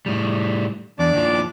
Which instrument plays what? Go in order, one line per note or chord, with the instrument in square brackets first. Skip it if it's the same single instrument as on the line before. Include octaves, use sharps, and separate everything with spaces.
[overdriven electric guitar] A2 G3
[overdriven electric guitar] E2 [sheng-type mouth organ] D4 D5 D6
[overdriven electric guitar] D#2 F3